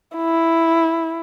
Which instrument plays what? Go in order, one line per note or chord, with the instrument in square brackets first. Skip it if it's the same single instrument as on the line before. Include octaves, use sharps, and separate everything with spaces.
[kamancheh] E4